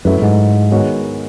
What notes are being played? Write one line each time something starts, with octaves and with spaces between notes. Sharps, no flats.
F#2 F#3 A3 E4 B4
G#2
D#3 G#3 B3 F#4 C#5